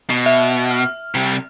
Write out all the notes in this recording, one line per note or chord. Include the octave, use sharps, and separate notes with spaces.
B2
E5
F6
C3 G3